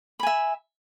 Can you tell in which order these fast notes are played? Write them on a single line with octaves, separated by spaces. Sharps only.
B5 G#5 E5